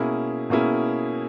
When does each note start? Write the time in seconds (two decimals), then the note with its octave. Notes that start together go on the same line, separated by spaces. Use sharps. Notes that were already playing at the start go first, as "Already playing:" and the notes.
Already playing: B2 A#3 C#4 E4 G#4
0.50 B2 A#3 C#4 E4 G#4